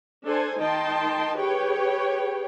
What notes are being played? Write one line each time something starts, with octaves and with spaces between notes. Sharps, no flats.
D4 A4 C5 G#5
D#3 D#4 D#5 G5 A5 C6
G4 G#4 B4 C#5 G5